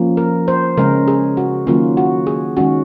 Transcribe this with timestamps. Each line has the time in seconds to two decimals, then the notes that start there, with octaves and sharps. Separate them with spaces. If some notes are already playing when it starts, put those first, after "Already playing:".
Already playing: F3 A#3 C#4
0.17 A#4
0.48 C5
0.77 C#3 G#3 C#4 A#4
1.08 G#4
1.37 F#4
1.67 D#3 F#3 A#3 C#4 F4
1.97 F#4
2.27 G#4
2.57 D#3 G#3 C#4 F#4